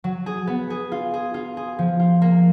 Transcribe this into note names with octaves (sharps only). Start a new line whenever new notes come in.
F#3
G#4
B3
G#4
F4
G#4
F4
G#4
F3
F4
A#3